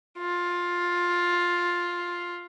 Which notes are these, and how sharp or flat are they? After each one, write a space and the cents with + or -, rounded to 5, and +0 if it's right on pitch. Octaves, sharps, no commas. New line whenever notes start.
F4 +10